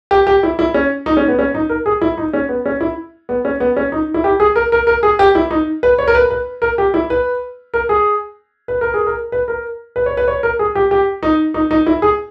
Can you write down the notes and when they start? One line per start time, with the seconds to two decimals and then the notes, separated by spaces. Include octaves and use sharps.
0.11 G4
0.27 G4
0.43 E4
0.59 E4
0.74 C#4
1.06 D#4
1.17 C#4
1.28 B3
1.39 C#4
1.54 D#4
1.69 A#4
1.86 G#4
2.01 E4
2.18 D#4
2.33 C#4
2.49 B3
2.66 C#4
2.81 E4
3.29 B3
3.45 C#4
3.60 B3
3.77 C#4
3.92 D#4
4.14 E4
4.24 G4
4.40 G#4
4.56 A#4
4.72 A#4
4.87 A#4
5.03 G#4
5.19 G4
5.35 E4
5.51 D#4
5.83 B4
5.99 C#5
6.08 A#4
6.15 B4
6.31 B4
6.62 A#4
6.78 G4
6.94 E4
7.10 B4
7.74 A#4
7.89 G#4
8.68 B4
8.81 A#4
8.94 G#4
9.07 A#4
9.32 B4
9.48 A#4
9.96 B4
10.06 C#5
10.17 B4
10.28 C#5
10.43 A#4
10.59 G#4
10.75 G4
10.91 G4
11.23 D#4
11.54 D#4
11.71 D#4
11.86 E4
12.02 G#4